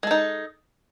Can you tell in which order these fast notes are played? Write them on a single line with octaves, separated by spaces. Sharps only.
G#3 A4 D#4